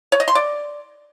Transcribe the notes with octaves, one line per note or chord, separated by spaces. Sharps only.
C#5
D#5
C6
D5